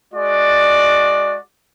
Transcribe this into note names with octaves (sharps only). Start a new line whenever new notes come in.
G#3 F#4 D5